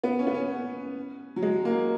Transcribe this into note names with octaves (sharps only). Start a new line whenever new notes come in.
B3
C#4
B3
C#4
F#3
G#3
A#3